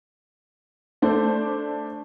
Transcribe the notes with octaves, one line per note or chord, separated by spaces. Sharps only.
A3 D4 C5 D5